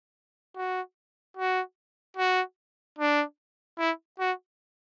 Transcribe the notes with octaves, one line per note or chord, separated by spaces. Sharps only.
F#4
F#4
F#4
D4
E4
F#4